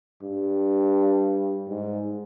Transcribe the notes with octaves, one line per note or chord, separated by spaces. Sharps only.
G2
G#2